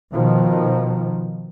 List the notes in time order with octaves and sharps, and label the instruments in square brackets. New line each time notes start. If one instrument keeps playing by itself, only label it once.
[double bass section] B2 D#3 F3